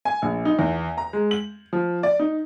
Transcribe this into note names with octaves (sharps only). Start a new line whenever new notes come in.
G#5
A#1
D#4
E2
A#5
G#3
F#7
F3
D5
D#4